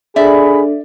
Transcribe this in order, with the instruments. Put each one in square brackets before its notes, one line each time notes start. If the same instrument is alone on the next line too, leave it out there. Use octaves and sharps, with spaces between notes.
[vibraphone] D4 A4 [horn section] G#4 B5 [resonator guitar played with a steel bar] D5 E5